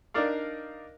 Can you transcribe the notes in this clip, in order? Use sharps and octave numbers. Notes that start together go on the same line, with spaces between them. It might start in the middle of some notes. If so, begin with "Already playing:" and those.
D4 D#4 A#4 D5 F5